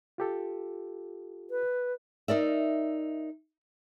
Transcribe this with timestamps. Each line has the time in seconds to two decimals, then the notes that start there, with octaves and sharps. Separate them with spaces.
0.18 F4 G4 A4
1.51 B4
2.28 D#4 A#4 D5 E5